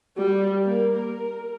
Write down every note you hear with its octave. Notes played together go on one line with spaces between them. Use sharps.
G3
A#3
A#4